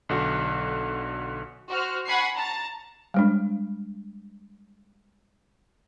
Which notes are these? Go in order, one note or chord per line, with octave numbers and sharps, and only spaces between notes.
B1 D3 F#4
F#4 C5 F6
F#5 G#5 B5 C#6 C7
A5 A#5 A6
G3 G#3 D4